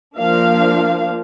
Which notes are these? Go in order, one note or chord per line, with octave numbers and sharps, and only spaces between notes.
F3 A#3 D4 F5